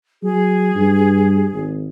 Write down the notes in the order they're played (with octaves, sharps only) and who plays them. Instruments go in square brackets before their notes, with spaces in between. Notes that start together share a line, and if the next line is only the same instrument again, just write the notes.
[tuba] F#3 [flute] G#4
[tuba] G2
G#1